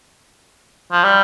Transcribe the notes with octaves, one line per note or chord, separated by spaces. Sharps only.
F3
G3